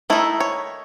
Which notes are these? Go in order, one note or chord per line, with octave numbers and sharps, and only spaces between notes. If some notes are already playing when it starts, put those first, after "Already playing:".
D#3 A3 D#4 E4
C#5